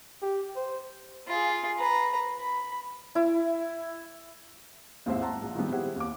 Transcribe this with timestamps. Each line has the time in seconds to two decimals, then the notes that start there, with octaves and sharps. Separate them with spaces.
0.23 G4
0.56 C5
1.27 F4 G#4
1.79 B4 A#5
2.39 B5
3.15 E4
5.06 D#2 G#2 C4 E4 C5 E5
5.22 F#5 A5 A#5 C6 E6
5.42 A#1
5.55 D#3 F3 G3 G#3 B3 C4
5.71 E4 G4 G#4 C5 F#5
5.96 D#2 D6